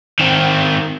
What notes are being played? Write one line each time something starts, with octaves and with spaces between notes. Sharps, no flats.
D#3 C4